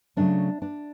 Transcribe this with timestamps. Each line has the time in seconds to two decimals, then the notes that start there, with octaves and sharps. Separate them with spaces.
0.17 C#3 F#3 A3 C#4 D4
0.62 D4